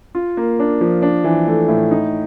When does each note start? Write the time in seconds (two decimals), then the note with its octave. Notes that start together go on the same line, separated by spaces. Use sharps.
0.15 F4
0.37 A#3
0.59 D4
0.81 F3
1.02 D4
1.24 E3
1.47 A3
1.68 A2
1.91 D#4